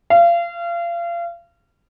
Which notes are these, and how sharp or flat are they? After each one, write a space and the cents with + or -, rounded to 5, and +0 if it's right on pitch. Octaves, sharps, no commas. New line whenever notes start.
F5 -30